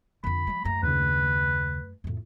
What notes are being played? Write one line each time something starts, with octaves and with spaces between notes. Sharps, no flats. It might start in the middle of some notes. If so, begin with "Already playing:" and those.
F2 D3 B5
F3 G#3
F#2 A3 A#5
D#2 C#3 B4
F2 A2